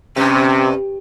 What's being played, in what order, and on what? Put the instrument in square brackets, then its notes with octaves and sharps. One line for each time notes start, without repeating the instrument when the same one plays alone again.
[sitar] G2 [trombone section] C3 [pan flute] C#4